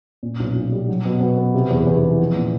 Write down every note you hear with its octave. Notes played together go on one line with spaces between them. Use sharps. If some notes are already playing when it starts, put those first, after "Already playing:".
A#2
B1
B1
G3
F#3
B2
B2
B3
C3
E2
E2
E3
F3
A#2